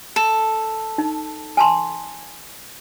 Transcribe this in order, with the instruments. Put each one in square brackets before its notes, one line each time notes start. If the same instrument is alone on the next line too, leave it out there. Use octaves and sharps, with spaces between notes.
[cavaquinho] A4
[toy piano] D#4
G#5 A5 C6